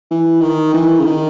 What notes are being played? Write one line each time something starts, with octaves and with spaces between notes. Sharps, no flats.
E3
D#3
E3
C#3
D#3